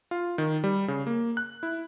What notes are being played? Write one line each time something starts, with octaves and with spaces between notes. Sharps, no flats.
F4
D#3
G3
C#3
A#3
F#6
E4